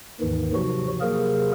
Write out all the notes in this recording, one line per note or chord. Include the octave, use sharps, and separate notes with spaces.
D#2 G#2 D#3 E3
C3 F3 F#3 F#4
C3 F3 F#3 A#3 G#4 A#4